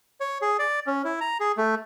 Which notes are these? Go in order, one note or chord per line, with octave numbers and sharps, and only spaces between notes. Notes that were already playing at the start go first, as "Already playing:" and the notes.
C#5
G#4
D5
C#4
E4
A#5
G#4
A3